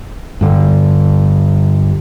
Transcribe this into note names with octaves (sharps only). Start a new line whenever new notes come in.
G2 D3